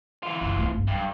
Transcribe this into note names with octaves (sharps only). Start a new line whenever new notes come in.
E3 F4
F#1
A3 C4
G1
G2 F#3